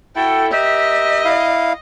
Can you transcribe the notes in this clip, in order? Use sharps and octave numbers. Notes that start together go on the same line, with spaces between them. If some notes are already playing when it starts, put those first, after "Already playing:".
E4 F#4 A4 G5
G4 A#4 D#5 E5
E4 F5